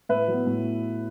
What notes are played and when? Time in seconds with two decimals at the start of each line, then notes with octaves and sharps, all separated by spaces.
0.09 A2 B4 E5
0.28 F#3 B3
0.47 A2